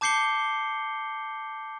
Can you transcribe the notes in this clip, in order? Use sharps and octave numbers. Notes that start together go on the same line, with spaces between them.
A5 D6 G6 C7 C#7 G7